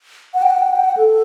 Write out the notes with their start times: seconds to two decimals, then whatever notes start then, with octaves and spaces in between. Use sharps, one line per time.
0.34 F#5
0.42 G5
0.50 F#5
0.59 G5
0.67 F#5
0.76 G5
0.84 F#5
0.97 A4